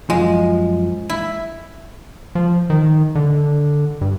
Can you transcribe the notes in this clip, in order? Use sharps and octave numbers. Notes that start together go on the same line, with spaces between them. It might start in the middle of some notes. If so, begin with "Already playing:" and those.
F#2 F3 G#3
E4
F3
D#3
D3
G2